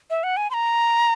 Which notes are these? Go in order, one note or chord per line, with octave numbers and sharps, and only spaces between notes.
E5
F#5
G#5
C6
A#5